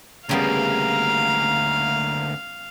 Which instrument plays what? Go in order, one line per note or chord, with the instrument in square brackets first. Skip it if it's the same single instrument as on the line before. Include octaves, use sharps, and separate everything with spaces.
[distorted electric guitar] D2 A#3 [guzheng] C#3 G3 B3 [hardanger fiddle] F5 [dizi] A#5